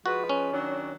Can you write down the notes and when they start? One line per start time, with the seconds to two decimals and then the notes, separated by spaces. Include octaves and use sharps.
0.06 F3 G#3 F#4 B4
0.29 C#4
0.53 D#3 F#3 D4